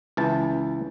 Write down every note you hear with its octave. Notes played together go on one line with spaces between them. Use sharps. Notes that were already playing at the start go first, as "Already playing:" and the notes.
C#2 E3 A5